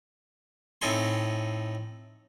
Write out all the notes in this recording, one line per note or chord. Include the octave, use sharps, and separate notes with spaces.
A2 C4 D#4 A4 G#5 C6